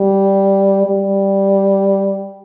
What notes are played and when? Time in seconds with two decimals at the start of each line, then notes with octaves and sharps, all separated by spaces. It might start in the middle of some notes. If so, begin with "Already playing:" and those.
Already playing: G3
0.86 G3